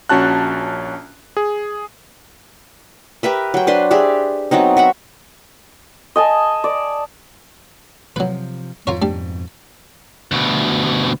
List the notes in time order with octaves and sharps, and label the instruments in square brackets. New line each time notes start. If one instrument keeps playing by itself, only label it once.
[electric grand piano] A#1 C#4 F#4 A5 F#6
G#4
[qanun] G4 A#4 B4 E5
F#3 G5
D4 B4 C5 C6
G4 G#4 D5 E5
F#3 B3 C4 D#4
F#4 E5 F#5
[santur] D#5 G#5 A5
D5
[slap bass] C3 F3 [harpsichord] F#3 B4
[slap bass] F2 G#2 B2 [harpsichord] F4 A#4 C#5
[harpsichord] G3 D4
[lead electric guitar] D2 B2